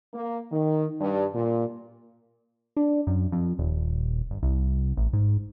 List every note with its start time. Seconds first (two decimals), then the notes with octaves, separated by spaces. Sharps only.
0.14 A#3
0.52 D#3
1.00 G2
1.34 A#2
2.77 D4
3.07 F#2
3.32 F2
3.59 D#1
4.31 G1
4.43 C2
4.97 A1
5.13 G#2